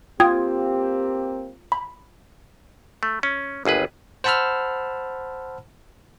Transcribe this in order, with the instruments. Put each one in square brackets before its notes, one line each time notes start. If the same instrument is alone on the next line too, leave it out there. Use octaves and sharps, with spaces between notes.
[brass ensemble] A#3 C4 G4 [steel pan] F4 [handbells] G5 D#6 G#6
[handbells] B5
[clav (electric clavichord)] A3
C#4
G1 D#2 G#4 B4
[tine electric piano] C5 F#5 A5 B5 E6 F6